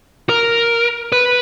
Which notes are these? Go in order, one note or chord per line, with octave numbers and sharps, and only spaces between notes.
A#4
B4